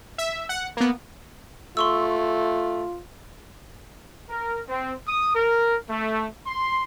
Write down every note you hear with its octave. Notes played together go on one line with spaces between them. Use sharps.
E5
F#5
A#3 B3
A3 F4 C6 C#6 E6
A#4
C4
D#6
A#4
A3
C6